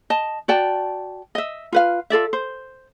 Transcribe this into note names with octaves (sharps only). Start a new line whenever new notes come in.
D#5 A5
F#4 D5 G5 A5
D#5 E5
F4 B4 F5
F4 A4 D5 E5
C5